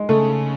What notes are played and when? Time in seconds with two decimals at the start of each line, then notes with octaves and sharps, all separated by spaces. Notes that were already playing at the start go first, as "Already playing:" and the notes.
Already playing: G#3
0.09 C#3 A3